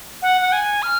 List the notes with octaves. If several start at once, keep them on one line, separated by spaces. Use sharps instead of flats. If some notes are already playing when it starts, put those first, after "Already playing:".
F#5
F#5
G#5
F6